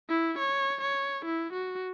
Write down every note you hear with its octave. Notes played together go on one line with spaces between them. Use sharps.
E4
C#5
C#5
E4
F#4